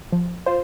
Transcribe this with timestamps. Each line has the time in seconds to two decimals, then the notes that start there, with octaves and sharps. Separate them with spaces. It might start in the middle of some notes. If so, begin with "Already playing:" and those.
0.12 F3
0.46 F4 C5